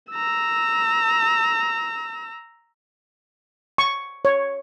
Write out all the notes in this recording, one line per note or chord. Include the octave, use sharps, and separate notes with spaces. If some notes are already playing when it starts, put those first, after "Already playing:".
A#5 E6
C#6
C#5